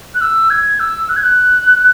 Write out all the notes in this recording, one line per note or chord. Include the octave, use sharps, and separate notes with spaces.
F#6
E6
G#6
E6
F#6
G#6
F#6